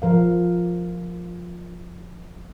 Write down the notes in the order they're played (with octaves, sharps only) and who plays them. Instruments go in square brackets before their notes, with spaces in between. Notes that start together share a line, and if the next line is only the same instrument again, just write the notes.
[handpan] F3 A#4 F5